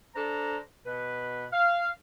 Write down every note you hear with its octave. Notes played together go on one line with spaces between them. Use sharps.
D4 A4 C5 A#5
B2 B4
F5